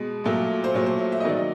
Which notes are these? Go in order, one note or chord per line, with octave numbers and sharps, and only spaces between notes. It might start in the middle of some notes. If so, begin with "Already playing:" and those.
Already playing: B2 G#3
A#2 F#3 A3
C5
A#2 F#3 A3 C#5
C5
E5
E5
D#5
D#3 F#3 A#3 D5
D#5